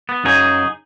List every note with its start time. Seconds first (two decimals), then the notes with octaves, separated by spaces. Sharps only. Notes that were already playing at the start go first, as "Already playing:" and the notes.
0.09 B3
0.24 F#2 C#3 F#3 D#4 G#4